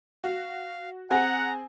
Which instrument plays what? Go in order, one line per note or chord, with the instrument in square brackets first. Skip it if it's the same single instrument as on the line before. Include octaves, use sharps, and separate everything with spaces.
[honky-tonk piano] F#4 [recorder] F5
[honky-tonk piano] C4 G#4 G#5 [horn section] F#5 [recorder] A#5